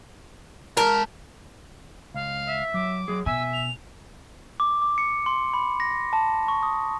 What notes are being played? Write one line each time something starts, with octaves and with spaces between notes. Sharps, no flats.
G#3 A#4 A5
C#2 F5
E5
F#3 D6
F#3 G#4
B2 E5 G#5 E6
F7
D6
D6
C#7
C6
B5
A#6
A5
C#6
D#6